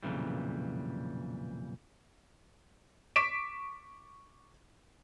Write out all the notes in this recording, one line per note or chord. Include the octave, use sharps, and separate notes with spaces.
B1 F2 A#2 C#3 E3 G3
C#6 D6 B6 D7 E7